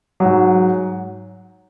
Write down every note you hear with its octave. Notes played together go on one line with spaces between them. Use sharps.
G#2 F#3